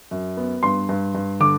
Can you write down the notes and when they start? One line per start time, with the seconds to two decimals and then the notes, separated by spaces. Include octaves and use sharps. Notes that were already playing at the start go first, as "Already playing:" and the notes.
0.11 F#2
0.37 B3
0.63 G2 C6
0.89 G2
1.15 G2
1.40 D3 D6